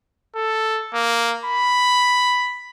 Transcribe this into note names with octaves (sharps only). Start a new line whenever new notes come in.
A4
A#3
B5